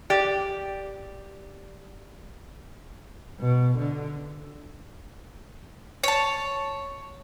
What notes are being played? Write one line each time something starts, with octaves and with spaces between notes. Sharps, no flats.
G4 D5
B2
D3
C#5 A5